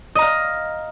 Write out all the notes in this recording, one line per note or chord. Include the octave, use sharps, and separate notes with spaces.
D#5 F5 A#5